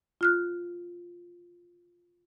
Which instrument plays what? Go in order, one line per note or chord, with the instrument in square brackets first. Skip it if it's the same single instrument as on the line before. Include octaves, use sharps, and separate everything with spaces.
[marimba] F4 F6 F#6